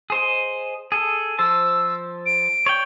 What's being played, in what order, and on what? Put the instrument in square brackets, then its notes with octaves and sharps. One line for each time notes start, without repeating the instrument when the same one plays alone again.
[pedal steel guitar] G#4 C5 D#5
G#4 A4
[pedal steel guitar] F3 C5 A5 [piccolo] E6
[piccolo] D7
[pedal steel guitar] C#5 D5 G5